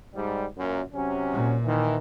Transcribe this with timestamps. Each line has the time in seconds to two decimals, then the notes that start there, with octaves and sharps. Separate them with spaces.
0.14 G#2 G3
0.57 F#2 A#2
0.93 C3 F#3 C#4
1.32 A#2
1.63 D#3 E3